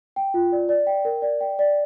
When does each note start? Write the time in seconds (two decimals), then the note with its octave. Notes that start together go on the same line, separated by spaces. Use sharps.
0.16 G5
0.34 F4
0.52 D5
0.69 D5
0.87 G5
1.05 A#4
1.22 D5
1.40 G5
1.59 D5